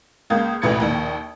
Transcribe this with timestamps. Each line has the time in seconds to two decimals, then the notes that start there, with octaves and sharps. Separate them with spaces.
0.30 C#2 A#3 D#6 G6 G#6
0.62 A1 D2 B2 B4 G#6 C#7
0.80 A#1 D#2